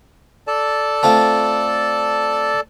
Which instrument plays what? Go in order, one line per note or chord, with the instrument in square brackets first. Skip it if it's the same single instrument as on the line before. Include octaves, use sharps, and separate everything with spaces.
[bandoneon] A4 D5 A5
[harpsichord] A3 C4 F4